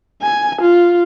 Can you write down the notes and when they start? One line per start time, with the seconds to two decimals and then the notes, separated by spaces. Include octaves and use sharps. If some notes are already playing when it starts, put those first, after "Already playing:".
0.22 G#5
0.61 F4